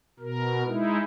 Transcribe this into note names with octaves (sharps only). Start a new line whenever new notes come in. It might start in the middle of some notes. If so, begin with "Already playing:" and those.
B2 A#4
G#3 D#4 E4